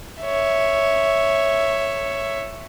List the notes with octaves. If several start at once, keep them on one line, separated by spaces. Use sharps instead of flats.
C#5 E5